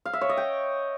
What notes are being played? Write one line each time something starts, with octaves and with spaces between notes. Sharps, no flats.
F5
E5
C#5
D#5
G5